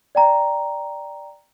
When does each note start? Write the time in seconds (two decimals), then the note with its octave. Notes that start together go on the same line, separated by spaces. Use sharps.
0.15 D5 G5 A#5